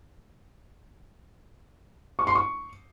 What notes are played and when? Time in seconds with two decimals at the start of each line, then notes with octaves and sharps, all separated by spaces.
2.19 C#6
2.27 C6
2.35 C#6